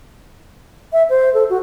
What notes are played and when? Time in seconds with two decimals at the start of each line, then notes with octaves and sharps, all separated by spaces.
0.93 E5
1.09 C5
1.34 A4
1.50 F#4